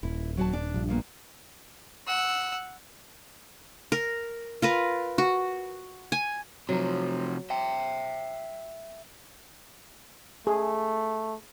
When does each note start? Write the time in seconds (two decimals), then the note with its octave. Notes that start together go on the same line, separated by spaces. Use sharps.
0.03 D#1 E4
0.37 F#3 F#4 A5
0.53 D4
0.74 A#1 G2
0.89 A#2 A#3 B3
2.07 F#5 E6
3.92 A#4
4.62 F4 A#4 B4
5.18 F#4
6.12 G#5
6.69 C3 F3 F#3
7.50 E5 G5
10.47 A3 G#4